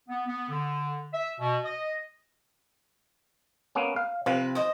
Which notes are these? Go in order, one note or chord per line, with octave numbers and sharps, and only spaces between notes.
B3
B3
D3
E5
B2
D#5
A#3 B3 C#4
F5
C3 F3 C4 B4 F5
C5 D#5